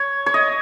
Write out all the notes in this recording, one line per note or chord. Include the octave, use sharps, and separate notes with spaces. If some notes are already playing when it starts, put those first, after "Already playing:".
Already playing: C#5
C#5
D#5